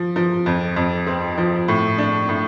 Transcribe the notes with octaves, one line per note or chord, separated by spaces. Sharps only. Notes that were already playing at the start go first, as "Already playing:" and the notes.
Already playing: F3
F3
F2
F2
C4
F3
A2
D4
A2